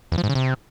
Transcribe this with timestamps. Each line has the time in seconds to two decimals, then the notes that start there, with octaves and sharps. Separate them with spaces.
0.12 E2
0.18 F3
0.24 G#2
0.29 C#3
0.35 C3